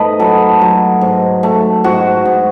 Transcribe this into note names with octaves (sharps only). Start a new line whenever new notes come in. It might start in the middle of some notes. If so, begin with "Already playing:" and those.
Already playing: G#2 A3 B4 D#5
F#3 A4
F#3
G#2
A3
G#2 F#4
G#2